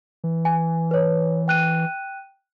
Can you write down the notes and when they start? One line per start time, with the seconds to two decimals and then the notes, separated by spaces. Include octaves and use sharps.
0.24 E3
0.45 G#5
0.91 B4 C#5
1.48 G5 F#6 D#7